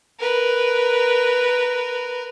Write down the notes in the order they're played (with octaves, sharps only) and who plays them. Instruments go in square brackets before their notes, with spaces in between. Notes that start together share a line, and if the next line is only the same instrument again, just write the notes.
[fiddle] A#4 B4